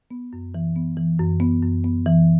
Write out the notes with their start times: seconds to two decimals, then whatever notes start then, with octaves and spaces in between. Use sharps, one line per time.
0.11 B3
0.33 F#2
0.55 E3
0.76 B3
0.97 E3
1.19 F#2
1.40 B3
1.63 F#2
1.84 B3
2.06 E3